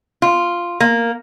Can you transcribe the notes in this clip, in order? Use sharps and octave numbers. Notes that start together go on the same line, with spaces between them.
F4
A#3